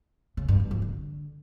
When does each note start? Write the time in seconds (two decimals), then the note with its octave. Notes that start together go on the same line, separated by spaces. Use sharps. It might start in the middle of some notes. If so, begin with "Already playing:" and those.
0.37 C#3
0.48 G2
0.60 G#2
0.71 F3
0.82 D3